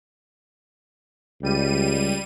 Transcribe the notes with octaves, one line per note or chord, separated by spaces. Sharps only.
C#2 G3 D#7